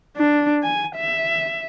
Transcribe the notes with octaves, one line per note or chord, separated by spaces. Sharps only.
D4
G#5
E5